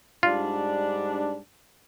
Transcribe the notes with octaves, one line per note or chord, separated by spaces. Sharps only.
G#2 G3 D4 F4